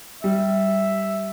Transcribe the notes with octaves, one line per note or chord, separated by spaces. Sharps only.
G3 E5